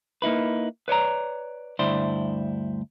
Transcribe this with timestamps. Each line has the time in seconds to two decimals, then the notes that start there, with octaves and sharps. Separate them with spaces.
0.22 A#3 D#4 E4 B4
0.88 B4 C#5 D5 A#5
1.79 D2 G2 E4 C5 D5